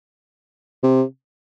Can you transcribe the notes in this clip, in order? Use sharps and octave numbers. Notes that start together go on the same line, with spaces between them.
C3